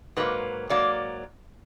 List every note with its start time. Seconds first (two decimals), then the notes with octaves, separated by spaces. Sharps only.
0.17 G#2 F#3 A#3 B4
0.69 G#2 F#3 A#3 D5